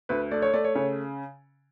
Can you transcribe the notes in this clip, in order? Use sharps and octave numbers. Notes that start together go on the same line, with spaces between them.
D2 B4
A3 D5
C#5
A3 D5
C#5
C#3 C#5